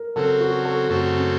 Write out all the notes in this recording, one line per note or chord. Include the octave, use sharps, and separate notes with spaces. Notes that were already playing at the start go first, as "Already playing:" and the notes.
Already playing: A#4
C#3 F#3 C4 A4
F#4
A4
F#2 C#3 A3 C4 F#4
C#4